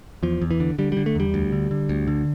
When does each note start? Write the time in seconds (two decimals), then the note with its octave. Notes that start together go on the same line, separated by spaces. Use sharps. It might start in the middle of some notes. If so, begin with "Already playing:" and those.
0.23 E2 F3
0.42 E2
0.51 E3
0.60 D3
0.79 D3 G3
0.92 G3
0.97 D3
1.06 A3
1.15 E2 G3
1.34 D2
1.52 D3
1.71 D3
1.89 D2
2.07 D3